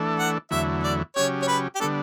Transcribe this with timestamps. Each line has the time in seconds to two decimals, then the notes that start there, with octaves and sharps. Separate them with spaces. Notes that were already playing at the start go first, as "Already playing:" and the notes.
Already playing: E3 A3 D4 A4
0.19 F#5
0.51 E2 D3 F#3 A3 E4 E5
0.83 D5
1.16 C#3 F#3 C#4 G4 C#5
1.42 C#5
1.48 B4
1.75 G4
1.80 D3 G3 B3 D4 A4